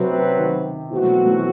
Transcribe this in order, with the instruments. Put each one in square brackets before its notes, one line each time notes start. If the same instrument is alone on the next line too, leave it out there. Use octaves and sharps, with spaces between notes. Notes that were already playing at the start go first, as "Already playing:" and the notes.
Already playing: [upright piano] C3 [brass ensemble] F#3 C4 F#4 B4
[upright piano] C3
D#3
[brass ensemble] B2 A3 C4 F#4 [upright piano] E3
[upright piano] F#3
F#3
E3